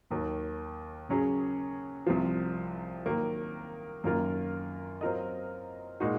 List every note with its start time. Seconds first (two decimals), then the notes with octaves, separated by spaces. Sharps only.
0.10 D#2 D#3 F#3
1.09 C#3 F#3 C#4 G#4
2.07 C2 C3 F3
3.06 D#3 F#3 A#3
4.04 F#2 D#3 A#3 F4 A#4
5.01 F#3 C4 F4 A#4 D#5
6.00 A#2 G#3 D#4 F#4